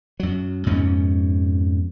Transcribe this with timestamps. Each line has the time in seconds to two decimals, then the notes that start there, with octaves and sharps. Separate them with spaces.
0.20 F#2 F#3
0.66 F2 G#2 B2 C#4